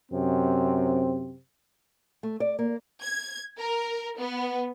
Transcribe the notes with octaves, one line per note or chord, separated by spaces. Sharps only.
F#2 C3 C4
A3
D5
A#3
G#6
A#4
B3